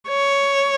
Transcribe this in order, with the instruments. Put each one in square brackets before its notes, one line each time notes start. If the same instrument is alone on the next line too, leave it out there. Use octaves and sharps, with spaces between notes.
[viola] C#5